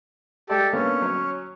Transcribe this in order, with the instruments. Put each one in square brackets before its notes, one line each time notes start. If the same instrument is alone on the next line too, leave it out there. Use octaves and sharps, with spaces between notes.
[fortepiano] G#3 A3 D5 [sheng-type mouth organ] G4 A4
[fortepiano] D3 A#3 B3 [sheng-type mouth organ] C#4
[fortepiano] F#3 C#5